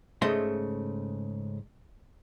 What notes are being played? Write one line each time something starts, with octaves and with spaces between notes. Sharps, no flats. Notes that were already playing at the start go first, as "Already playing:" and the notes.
G#2 C#3 A3 D#5 E5 C6